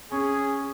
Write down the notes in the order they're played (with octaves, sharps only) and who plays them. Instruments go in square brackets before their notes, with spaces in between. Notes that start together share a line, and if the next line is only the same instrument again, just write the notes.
[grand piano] C#4 [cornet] G#4